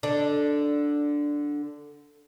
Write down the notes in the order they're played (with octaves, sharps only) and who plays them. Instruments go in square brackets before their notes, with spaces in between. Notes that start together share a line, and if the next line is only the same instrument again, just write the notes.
[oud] D3 D4